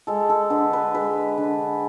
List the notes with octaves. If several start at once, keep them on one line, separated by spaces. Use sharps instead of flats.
G#3 A4
A4
D3 B4
B4
G#3 B4
D3